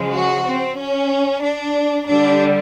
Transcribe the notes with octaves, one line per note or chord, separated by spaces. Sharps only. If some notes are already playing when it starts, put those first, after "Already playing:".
Already playing: C#3 F3 G#3
F#4
C4
C#4
D4
D3 G3 D4